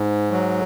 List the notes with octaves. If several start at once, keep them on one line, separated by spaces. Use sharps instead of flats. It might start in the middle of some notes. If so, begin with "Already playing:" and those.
Already playing: G#2
F#3